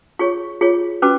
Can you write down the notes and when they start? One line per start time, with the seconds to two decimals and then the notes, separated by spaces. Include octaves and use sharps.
0.19 F4 G#4 C#5 C#6
0.61 F4 G#4 C#5
1.02 C#4 F#4 B4 D6